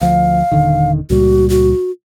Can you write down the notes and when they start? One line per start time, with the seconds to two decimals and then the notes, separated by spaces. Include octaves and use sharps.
0.01 D2 F3 F5
0.52 D#1 D3 D#3
1.10 C#2 A#2 G3 F#4
1.50 F#4